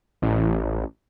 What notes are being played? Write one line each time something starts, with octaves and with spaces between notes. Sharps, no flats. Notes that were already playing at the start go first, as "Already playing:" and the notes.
A1